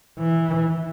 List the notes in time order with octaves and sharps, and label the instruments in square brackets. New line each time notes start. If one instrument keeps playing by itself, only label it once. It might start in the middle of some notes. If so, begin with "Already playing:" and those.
[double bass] E3